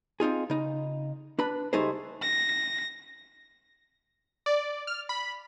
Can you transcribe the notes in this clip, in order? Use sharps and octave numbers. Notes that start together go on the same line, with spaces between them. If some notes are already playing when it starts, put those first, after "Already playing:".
C4 D#4 F4 G#4
C#3 D#4
D4 B4 B5
C#2 G3 A3 D#4 G#4 C5
A#6
D5
F6
B5